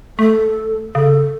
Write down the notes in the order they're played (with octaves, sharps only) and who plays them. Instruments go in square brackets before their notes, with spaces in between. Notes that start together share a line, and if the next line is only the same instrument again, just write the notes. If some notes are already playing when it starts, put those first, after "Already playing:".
[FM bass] A3 [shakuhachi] A4
[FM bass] C#3 [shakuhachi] A4